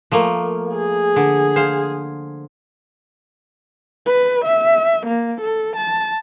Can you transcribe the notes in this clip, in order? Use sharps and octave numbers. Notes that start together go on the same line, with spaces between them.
F3 A3 A#3
G#4
D3
C5 F5
B4
E5
A#3
A4
A5